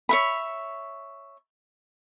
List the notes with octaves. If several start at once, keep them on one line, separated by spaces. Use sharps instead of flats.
C#5 E5 B5